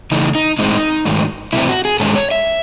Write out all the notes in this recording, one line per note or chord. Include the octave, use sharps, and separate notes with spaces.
C#3 E3 A3 D#4
D#4
A2 G#3 C4 D#4
G#2 D#3 F#3 A3
C3 E3 A3 C4 E4
F#4
G#4
G#2 D#3 G#3 C#4 A4
C#5
E5